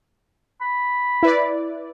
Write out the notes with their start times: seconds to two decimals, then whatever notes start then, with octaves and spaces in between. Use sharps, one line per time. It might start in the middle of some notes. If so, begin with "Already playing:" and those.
0.61 B5
1.23 E4 B4 D5